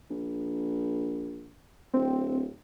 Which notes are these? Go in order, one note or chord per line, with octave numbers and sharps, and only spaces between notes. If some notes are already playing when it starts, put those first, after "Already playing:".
A#1
D1 C4